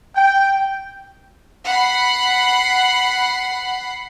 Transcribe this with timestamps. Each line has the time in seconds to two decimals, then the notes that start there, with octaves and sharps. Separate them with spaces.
0.16 G5
1.66 F#5 B5 C7